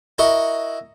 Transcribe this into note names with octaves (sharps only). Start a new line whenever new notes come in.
E4 F#4 A#4 D#5 C#6